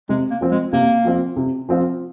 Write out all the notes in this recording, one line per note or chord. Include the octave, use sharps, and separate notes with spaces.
C3 G#3
A#3
F3 C4 F4
G#3
C3 A#3
F3 C4 F4
C3
F3 C4 F4